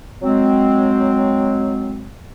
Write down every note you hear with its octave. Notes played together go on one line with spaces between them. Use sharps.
F#3 G#3 C4